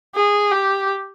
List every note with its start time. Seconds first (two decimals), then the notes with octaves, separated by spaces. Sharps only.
0.15 G#4
0.52 G4